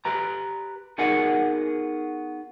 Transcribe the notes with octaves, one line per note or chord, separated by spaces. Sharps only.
G4 B4 A#5
B3 D#4 F#4 G#4 A#4 F#5